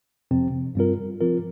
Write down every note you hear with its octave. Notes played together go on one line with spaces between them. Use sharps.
F2 C3 F3 C4
G2 G3 C4 F4 A#4
F3 C4 F4 A#4